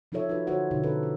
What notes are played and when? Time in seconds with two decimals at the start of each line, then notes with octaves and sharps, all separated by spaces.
0.12 F3 D#4 F4 A4 C#5 E5
0.29 D#4 F4 F#4 A4 B4
0.47 D3 F#4 C5 C#5 F#5
0.71 B2 D3 D#4
0.83 C#4 A4 B4
1.03 G4